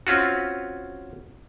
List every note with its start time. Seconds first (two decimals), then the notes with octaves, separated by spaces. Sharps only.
0.07 C4 C#4 F4 F#4